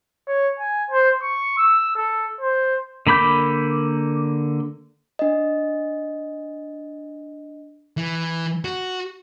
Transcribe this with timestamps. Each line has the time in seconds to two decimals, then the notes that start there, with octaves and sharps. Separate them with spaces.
0.28 C#5
0.60 G#5
0.91 C5
1.23 C#6
1.58 E6
1.97 A4
2.41 C5
3.07 D3 A#3 B5 D6 G6
5.19 D4 D#5
7.97 E3
8.64 F#4